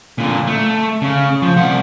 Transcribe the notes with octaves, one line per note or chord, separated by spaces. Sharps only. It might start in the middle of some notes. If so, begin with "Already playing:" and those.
A#2 D3
A3
C#3
F3
C2 F#5